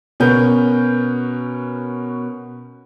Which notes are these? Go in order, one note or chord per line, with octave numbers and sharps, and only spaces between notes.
B2 C#4 A#4 B4 G6